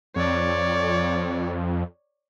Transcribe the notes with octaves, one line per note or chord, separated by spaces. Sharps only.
F2 C#5 D5